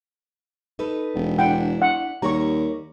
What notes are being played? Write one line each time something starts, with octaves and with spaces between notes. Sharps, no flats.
D#4 A4 B4
E1
D4 E4 F#5 G5
F#5
D#2 G3 A#4 C#5 A#5 C#6